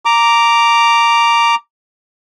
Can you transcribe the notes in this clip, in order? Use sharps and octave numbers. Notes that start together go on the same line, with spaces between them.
A#5 D6